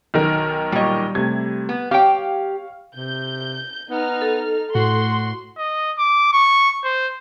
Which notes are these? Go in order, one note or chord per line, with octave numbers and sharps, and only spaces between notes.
B1 D#3 A#4
A#2 G3 C#5 D#5
C3 A3 G#6
B3
G4 C#5 F5 G5
C3 G6
B3 D#4 F6
A4
A2 F#4 C6
D#5
D6
C#6
C5